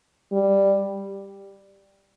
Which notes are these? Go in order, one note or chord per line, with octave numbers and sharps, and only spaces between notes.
G3